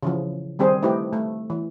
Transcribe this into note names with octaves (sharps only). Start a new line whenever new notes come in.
C#3 E3 F3
D#3 G3 C4 G#4 C5
A3 D#4 E4 G4 B4
A3
E3